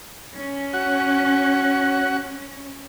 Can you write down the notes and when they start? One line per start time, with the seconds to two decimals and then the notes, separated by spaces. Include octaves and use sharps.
0.33 C#4
0.73 F#4